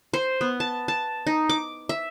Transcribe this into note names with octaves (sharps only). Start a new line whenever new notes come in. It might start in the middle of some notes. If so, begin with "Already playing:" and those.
C5
B3
A5
A5
D#4
D6
E5